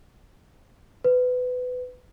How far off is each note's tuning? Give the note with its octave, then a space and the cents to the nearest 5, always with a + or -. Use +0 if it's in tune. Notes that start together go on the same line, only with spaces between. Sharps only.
B4 +20